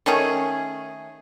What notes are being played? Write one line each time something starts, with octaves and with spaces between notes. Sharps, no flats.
D#3 A3 C#4 G#4